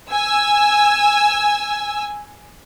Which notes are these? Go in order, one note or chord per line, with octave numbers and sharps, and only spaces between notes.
G#5 E6